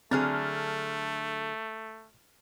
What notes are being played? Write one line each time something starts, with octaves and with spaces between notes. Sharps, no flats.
D3 F#3 A3 C4 G#4 F6 A6